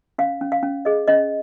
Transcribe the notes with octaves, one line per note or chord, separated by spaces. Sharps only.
C#4 F5
C#4
F5
C#4
G#4 D#5
C#4 D#5